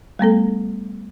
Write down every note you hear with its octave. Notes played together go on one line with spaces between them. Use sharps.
G3 A3 B3 A4